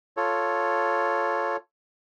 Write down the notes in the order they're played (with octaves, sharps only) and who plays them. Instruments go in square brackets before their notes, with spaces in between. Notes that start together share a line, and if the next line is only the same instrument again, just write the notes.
[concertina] F4 A4 C#5